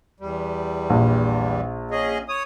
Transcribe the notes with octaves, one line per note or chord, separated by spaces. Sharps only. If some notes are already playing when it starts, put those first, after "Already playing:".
E2 G3
A#1
C#4 G#4 D#5
C#5 D#6